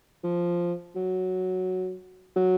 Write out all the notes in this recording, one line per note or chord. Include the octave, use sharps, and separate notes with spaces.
F3
F#3
F#3